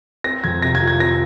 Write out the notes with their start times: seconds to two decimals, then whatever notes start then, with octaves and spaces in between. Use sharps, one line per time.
0.24 C4 A#6
0.44 F2 G#6
0.62 C3 A#6
0.75 G#6
0.81 F3
0.87 G#6
1.00 C4 A#6